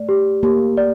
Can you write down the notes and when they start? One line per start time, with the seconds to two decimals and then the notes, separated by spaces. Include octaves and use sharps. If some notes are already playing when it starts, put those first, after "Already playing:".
Already playing: A3 D5
0.09 G4
0.43 A#3 G4
0.77 D5